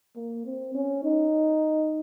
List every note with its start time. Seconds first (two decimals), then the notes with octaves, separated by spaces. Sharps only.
0.16 A#3
0.45 C4
0.75 C#4
1.04 D#4